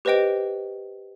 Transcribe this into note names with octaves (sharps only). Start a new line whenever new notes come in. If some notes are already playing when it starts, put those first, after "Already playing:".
G4 B4 C5 D#5 G5 D7